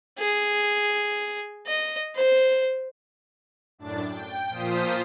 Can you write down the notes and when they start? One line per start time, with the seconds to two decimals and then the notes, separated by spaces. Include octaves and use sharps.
0.19 G#4
1.67 D#5
2.15 C5
3.79 F#2 A2 D4 A6
4.08 G5
4.49 A#2 F3 F4 C5 D#6 B6